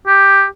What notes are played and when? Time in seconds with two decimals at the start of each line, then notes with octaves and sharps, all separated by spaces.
0.08 G4